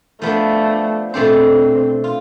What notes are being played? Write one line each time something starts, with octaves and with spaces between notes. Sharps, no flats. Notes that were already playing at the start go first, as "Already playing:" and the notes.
F3 A3 B3 D4
B2 A3 C4 D4 A4 C5
F4